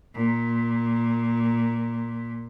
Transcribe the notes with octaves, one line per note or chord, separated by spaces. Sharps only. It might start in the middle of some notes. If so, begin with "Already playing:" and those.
A#2